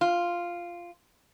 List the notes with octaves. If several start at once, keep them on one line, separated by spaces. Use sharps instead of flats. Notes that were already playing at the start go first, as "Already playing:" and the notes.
F4